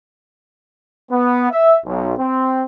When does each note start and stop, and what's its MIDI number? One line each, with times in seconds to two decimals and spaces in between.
1.11 1.49 59
1.51 1.76 76
1.85 2.14 35
2.17 2.62 60